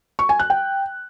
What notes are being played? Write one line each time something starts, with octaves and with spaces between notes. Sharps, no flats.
C#6
G#5
F#6
G5